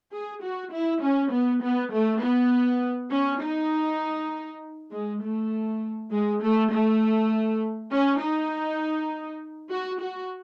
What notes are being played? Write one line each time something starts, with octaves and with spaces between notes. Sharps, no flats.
G#4
F#4
E4
C#4
B3
B3
A3
B3
C#4
D#4
G#3
A3
G#3
A3
A3
C#4
D#4
F#4
F#4